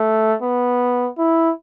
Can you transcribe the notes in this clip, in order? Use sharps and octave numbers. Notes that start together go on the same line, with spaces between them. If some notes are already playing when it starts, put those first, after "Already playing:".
Already playing: A3
B3
E4